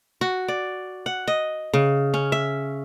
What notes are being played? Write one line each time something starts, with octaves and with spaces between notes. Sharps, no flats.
F#4
D5
F#5
D#5
C#3
C#4
E5